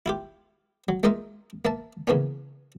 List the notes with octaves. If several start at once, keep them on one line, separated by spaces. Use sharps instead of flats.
E4 F4 G4
F#3
G#3 A#3 D#4 F4 D#5 E5
A#3 E5 A5
C#3 E3 A#3 B3 C#4